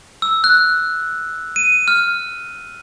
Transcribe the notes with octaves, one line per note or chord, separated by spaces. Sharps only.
E6
F#6
D#7
F6